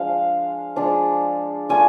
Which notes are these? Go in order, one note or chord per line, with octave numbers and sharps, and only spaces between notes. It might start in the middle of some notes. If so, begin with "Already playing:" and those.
Already playing: F3 G#3 D4 F5
F3 G#3 D4
A3 D4 F4 G#5